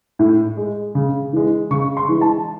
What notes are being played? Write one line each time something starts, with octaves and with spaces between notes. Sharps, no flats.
A2
G#3
C#3
E3 G#3
C#3 C#6
C6
E3 G#3
A5